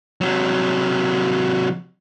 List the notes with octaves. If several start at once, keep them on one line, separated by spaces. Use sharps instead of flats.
C3 F#3